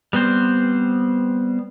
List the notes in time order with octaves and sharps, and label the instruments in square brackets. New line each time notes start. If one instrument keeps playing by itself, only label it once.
[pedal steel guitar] G3 B3 C4 C5